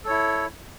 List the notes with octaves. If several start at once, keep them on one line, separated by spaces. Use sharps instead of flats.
E4 A4 C#5